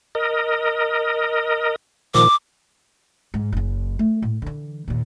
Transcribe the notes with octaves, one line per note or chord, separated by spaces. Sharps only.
A#4 D#5
A#2 D#3 F3 D6
G#2
F#1 C#3
A3
A2
D3 E3
D#2 A#2